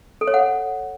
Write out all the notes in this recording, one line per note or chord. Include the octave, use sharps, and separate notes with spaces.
A4
C#5
F#5